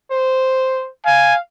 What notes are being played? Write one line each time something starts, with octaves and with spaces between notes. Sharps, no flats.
C5
F5 G#5